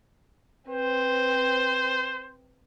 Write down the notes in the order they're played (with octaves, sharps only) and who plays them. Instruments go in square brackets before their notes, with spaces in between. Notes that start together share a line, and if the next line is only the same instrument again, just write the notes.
[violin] C4 B4 [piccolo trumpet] C5